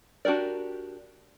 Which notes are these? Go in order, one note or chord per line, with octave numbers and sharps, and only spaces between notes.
D4 F#4 G4 A#4 D5